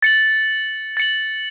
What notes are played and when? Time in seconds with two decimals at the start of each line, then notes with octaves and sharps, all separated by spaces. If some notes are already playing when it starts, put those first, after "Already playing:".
0.03 A6 C#7 F#7
0.97 A6 C#7 F#7